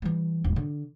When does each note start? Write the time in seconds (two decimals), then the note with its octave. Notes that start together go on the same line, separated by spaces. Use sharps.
0.02 E3 G3
0.44 D#1 G#1
0.56 D3